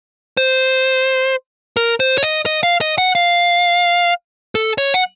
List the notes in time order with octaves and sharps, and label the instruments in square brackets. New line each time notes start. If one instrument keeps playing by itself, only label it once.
[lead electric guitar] C5
A#4
C5
C#5
D#5
D#5
F5
D#5
F#5
F5
A4
C#5
F#5